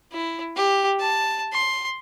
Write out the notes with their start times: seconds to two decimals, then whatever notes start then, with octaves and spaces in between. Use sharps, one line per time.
0.12 E4
0.56 G4
0.99 A5
1.53 C6